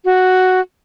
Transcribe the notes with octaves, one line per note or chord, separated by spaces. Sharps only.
F#4